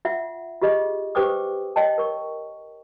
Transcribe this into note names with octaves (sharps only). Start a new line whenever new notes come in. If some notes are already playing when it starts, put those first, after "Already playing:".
F4 E5 F#5
F4 G4 G#4 D#5
G4 B4 C5 G5 D6 D#6
C#5 D#5 G5 A5
A#4 C#6